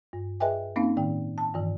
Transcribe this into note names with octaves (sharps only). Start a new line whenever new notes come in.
G2
G#4 B4 D#5 E5 G5 G#5
A#3 C4 C#4 D#4 F5
A2 D#3 G5
A5
G2 D#3 E3